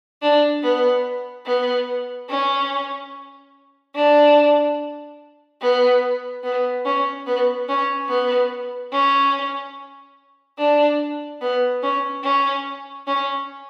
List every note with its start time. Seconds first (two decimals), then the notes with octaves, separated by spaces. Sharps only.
0.22 D4
0.63 B3
1.46 B3
2.29 C#4
3.95 D4
5.61 B3
6.44 B3
6.85 C#4
7.27 B3
7.69 C#4
8.09 B3
8.92 C#4
10.58 D4
11.41 B3
11.82 C#4
12.24 C#4
13.07 C#4